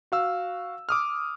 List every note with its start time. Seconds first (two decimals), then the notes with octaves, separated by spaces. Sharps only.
0.12 F#4 F5 E6
0.89 D6 D#6 F6